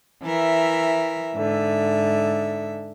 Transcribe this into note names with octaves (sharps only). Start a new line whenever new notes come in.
E3 A#4 E5
G#2 D3 E5